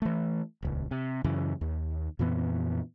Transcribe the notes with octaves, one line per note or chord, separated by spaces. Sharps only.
E3 A3
D#1 C#2
C3
F#2 C#3 E3
D#2
F2 A#2 E3 B3